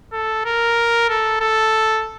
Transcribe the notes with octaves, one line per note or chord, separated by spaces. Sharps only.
A4
A#4
A4
A4